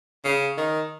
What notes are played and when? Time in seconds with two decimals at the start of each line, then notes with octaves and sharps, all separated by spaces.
0.24 C#3
0.57 D#3